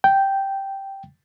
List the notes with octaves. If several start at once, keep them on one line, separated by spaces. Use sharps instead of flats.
G5